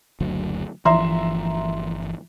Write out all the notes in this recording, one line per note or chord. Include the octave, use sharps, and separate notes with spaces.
F#1 D2 F#3
G1 E3 F3 E5 A#5 C6